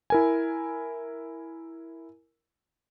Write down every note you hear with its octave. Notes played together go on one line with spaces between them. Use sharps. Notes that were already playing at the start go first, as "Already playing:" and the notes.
E4 A#4 G#5